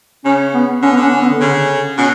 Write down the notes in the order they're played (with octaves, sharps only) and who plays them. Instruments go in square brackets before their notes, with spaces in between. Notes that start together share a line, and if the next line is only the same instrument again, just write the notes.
[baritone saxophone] C#3 [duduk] C#4
[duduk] B3
[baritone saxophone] D3 [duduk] C#4
[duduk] B3
[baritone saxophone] D3 [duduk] C#4
[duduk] C#4
B3
D3
[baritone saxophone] C#3
[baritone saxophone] B2 [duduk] C#4